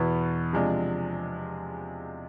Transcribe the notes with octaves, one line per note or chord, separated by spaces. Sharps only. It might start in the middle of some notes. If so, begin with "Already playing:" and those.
Already playing: E2 B2 B3 E4
C3 F3 G#3 D4